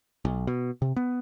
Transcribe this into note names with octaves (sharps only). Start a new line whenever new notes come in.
B1
B2
C3
B3